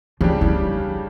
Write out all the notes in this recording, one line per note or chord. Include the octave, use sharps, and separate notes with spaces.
C#3 F3 G3 D4 G4
E4